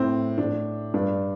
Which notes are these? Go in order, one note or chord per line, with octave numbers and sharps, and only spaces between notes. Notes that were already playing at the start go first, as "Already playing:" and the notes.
Already playing: A2 C4
A2 D4
G2 D4